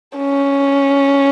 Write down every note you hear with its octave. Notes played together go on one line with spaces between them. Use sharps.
C#4